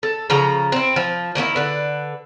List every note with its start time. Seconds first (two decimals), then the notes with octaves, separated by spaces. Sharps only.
0.03 A4
0.30 C#3 F3 A#5
0.72 C4 E4
0.96 F3
1.35 D#3 A#3 C#4 E4
1.56 D3 B4